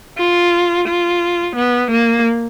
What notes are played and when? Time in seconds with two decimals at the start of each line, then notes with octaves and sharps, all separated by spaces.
0.18 F4
0.88 F4
1.56 B3
1.91 A#3